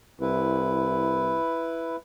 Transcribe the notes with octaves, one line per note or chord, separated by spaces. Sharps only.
C2 E4 B4